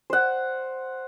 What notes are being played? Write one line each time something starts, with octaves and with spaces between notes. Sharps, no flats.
C5 F#5